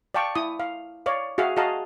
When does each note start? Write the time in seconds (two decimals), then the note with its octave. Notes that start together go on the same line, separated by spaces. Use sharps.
0.14 D5 F5 G5 A5 C#6
0.35 E4 D#6
0.60 F5
1.06 C#5 D5 F5
1.38 F#4 G#4 E5 F5
1.57 F#4 G#4 D#5 F5 A5 A#5